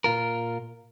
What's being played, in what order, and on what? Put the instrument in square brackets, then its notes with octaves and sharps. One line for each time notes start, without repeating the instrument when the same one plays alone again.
[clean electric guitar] A#2 F4 A#4